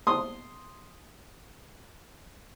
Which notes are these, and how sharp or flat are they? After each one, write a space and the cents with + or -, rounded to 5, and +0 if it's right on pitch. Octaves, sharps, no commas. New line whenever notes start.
C6 +0 D#6 +0